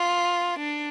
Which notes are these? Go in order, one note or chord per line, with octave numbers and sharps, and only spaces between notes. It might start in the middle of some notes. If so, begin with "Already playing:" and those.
Already playing: F4
D4